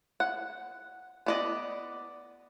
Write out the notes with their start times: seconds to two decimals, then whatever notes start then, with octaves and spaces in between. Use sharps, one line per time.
0.20 F#5
1.26 B3 D5 D#5